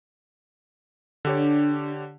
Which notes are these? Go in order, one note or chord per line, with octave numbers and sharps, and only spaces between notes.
D3 D4 G4 C#5